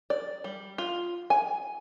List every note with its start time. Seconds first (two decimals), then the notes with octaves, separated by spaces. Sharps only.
0.10 D5
0.44 G3
0.78 F4
1.30 G#5